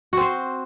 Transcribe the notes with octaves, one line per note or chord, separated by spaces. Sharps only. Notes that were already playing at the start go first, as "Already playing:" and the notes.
C4 F#4 C5